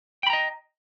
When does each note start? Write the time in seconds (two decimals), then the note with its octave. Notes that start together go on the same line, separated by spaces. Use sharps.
0.23 G5
0.27 B5
0.30 A#5
0.33 D#5